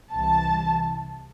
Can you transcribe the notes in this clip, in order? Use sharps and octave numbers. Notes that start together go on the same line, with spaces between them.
C2 C3 E3 A5